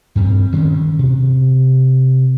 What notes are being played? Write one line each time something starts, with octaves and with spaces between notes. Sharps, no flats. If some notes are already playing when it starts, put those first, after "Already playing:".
G2 G3 C4
D2 D#3 C#4
C3